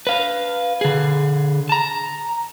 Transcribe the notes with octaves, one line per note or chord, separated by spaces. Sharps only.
B4 F5
D3 G#4
A5 A#5